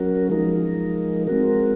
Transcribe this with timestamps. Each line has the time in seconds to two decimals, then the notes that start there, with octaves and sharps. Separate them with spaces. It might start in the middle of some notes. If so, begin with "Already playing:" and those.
Already playing: F#3 C#4 F#4 A#4
0.29 F3 G#3 D#4 A#4
1.27 G#3 C4 F#4 A#4